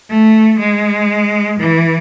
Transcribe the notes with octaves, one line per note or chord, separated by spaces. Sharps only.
A3
G#3
E3